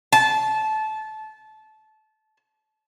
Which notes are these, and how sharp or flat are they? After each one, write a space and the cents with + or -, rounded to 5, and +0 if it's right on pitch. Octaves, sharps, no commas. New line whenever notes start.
A5 -20